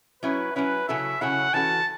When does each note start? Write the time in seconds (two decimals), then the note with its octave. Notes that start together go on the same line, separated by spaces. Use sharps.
0.23 F#3 C#4 E4 B4
0.56 F#3 C#4 E4 B4
0.88 C#3 F#3 C#4 E4 A4 E5
1.21 C#3 F#3 C#4 E4 A4 F#5
1.54 E3 C#4 F#4 A4 A5